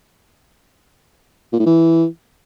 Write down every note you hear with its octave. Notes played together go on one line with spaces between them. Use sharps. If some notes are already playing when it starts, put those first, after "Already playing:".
A#2
A2
E3